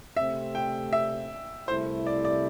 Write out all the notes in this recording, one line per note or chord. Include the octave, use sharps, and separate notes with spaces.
C3 A3 C4 E5
G5
E5
C2 C3 A3 E4 C5
D5
D5